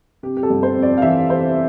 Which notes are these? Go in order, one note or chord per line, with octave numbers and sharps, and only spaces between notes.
C3 G4
G4
A4
G1
C5
F2
D5
F5
E3 E5
C3 C5